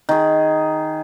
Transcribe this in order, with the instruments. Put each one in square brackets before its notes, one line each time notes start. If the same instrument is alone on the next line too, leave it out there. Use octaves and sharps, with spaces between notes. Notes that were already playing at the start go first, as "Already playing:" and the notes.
[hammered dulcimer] D#3 G#4